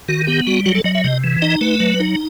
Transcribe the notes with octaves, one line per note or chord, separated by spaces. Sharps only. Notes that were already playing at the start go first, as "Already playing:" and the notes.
D#3 F#4
B3 G4
G3 F#4
F#3 F#4
A4
F#3 D#5
E5
C3 D#5
E3
D#4 D#5
A3 B4
F#3
D#4